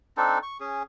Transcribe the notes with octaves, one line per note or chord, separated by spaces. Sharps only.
C4 D4 D#4 A4
C#6
C#4 G#4